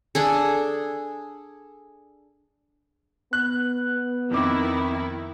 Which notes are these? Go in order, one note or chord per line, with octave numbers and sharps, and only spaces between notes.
D4 G#4 A4
B3 F#6
F2 D#3 E4 D6